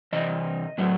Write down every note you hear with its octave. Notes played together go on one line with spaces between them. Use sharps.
C3 E3 D#5
A2 F#3 A3